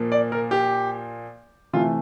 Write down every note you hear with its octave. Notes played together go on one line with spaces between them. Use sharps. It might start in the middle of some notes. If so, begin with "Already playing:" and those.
Already playing: A#2 F3 A#3
D5
A#4
G4
C3 E3 A3 F4